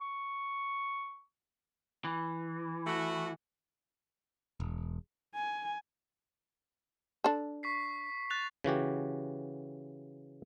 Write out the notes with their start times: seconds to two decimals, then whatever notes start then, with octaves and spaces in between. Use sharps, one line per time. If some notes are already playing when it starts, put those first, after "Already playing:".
0.01 C#6
2.05 E3
2.87 A3 E4 F#4
4.60 E1
5.35 G#5
7.24 D4 A4
7.63 C#6 B6 C7
8.30 F#6 A6 F7
8.64 C#3 E3 F#4 G4